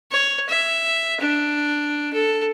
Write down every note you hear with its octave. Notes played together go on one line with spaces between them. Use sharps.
C#5
E5
D4
A4